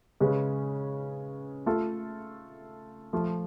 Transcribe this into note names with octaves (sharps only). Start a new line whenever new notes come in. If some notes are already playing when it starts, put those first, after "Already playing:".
C#3 G#3 C#4 G#4 B4
A3 F4 A4
F3 A3 F4